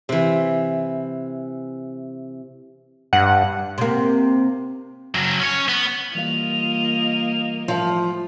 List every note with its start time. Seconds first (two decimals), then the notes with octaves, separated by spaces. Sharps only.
0.09 C3 E3
3.13 G2 F#5
3.78 C3 A#3
5.15 C#3 F#3
5.40 C#4 C#5
5.68 B3
6.15 E3 G3 A#3 F4 D#5 F5 F7
7.68 A2 F3